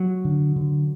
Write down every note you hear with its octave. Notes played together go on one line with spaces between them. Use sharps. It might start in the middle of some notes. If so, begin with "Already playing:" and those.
Already playing: F#3
D3
D3